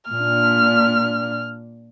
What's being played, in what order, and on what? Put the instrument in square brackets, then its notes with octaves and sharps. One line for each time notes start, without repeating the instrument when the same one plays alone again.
[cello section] A#2 D4 [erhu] F6